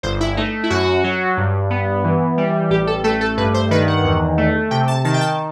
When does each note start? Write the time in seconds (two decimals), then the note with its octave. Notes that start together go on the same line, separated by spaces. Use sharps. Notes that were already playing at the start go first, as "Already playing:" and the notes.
0.03 G1 C5
0.20 E4
0.37 A3 D#4
0.63 E4
0.70 F#2 F#4
1.04 F#3
1.37 G2
1.70 B3
2.04 E3
2.38 G3
2.70 A1 G4
2.87 A4
3.04 A3 A4
3.21 A4
3.37 G2 B4
3.54 C5
3.71 D#3 B4
3.88 F#5
4.04 E2
4.38 A3
4.71 C3 G5
4.88 A5
5.05 D#3 A5
5.14 G5
5.21 A5